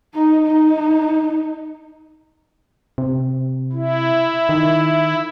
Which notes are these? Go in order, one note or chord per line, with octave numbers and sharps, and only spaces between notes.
D#4
D#4
C3
E4
D#3